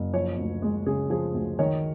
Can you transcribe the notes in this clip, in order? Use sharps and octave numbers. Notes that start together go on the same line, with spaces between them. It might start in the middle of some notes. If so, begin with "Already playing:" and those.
Already playing: F#1
F3 C#5
D2
G#3
C#3 G#4
F3 G#4
D2
D#3 C#5